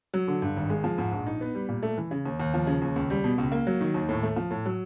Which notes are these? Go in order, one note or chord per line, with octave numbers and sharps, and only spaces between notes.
F#3
D3
G2
G#1
G#3
F3
G#2
A#1
D#4
B3
G3
A#2
A3
E3
C#3
D#2
D#2
F3
C#3
D#2
C#2
G3
B2
C#2
A#3
F#3
D#3
D#2
A2
A3
F3
A2
F#3